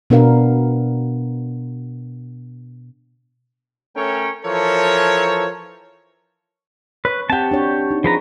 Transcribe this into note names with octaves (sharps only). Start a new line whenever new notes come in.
B2 B3 D4 A#4 F5
A3 C#4 A4 A#4 C#5 G5
E3 F3 A4 A#4 C#5
B4 C#5
C4 G4 F#5 A5
D4 F#4 C#5
D#4
F3 G#4 B4 A#5